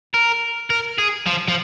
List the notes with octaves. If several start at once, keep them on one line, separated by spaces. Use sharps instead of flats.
A#4
A#4
G#4
F3
F3